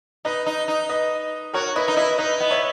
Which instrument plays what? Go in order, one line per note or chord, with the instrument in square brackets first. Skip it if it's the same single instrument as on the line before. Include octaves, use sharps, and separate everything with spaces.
[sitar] D#4 [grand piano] B4 D#5
[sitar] D#4
D#4
[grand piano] B4 D#5
[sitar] F#4 [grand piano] A#4 C#5
[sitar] E4 [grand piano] B4 D#5
[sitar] D#4
[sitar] E4 [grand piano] B4 D#5
[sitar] D#4 [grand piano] B4 D#5
[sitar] B3
[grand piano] C#5 E5